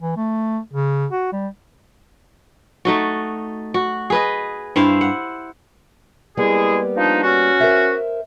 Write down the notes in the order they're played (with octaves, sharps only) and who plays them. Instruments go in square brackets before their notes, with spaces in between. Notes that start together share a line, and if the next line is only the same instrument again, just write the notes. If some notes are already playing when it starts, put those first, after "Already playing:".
[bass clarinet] E3
A3
C#3
F#4
G3
[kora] A3 D#4 F#4
F#4
G#4 B4 D#5
G2 E4 C5 F5
F#5
[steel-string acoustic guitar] G3 A#3 B3 [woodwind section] G#3 E4 G#4
[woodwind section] F3 D4 D#4
C#4 F#4
[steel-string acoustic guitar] A#4 C5 E5